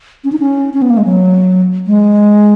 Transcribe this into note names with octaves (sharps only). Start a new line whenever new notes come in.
C#4
D#4
C#4
C#4
B3
A#3
G#3
F#3
G#3